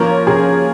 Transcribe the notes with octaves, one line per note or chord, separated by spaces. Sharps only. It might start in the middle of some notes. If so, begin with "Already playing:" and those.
Already playing: F3 A#3 C#4 A#4
G#4